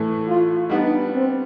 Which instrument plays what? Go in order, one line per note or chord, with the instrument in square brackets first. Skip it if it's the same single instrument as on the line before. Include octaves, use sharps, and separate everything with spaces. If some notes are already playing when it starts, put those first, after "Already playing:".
Already playing: [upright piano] A2 E3 A3
[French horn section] F4
[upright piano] G3 B3 D4 [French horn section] D#4
[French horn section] C4